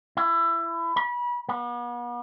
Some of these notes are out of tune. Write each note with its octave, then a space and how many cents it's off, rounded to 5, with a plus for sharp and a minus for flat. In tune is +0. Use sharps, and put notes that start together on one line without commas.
E4 +25
B5 -30
B3 -40